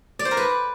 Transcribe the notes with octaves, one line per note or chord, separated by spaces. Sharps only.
D5
C5
A#4
B4